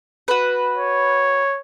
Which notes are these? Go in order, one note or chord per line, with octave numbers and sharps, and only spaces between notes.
F#4 B4
C#5